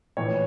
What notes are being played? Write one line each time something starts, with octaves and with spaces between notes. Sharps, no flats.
A#1 A2 E3 C#5